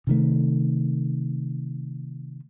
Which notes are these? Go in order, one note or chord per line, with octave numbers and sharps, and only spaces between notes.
C3 D#3 A3